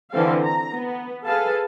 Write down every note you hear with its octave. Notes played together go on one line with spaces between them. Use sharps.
D3 E3 C4 A4 F5
A#5
B3
G#4 A4 B4 F5 A5